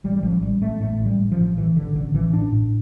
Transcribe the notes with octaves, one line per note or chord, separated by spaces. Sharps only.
A1 G3
G3
A1 F3
A1 G3
A1 A3
A2 A3
A1
G3
A1
F3
A2
A1 E3
A1 D3
A1 D3
A1 E3
A2 D4
A2